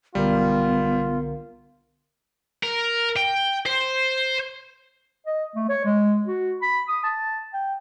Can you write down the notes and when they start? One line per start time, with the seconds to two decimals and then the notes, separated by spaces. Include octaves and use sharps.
0.15 B1 D3 G3 B3 F4 A#4
2.63 A#4
3.16 G5
3.66 C5
5.27 D#5
5.56 A3
5.69 C#5
5.85 G#3
6.27 F#4
6.62 B5
6.88 D#6
7.04 A5
7.53 G5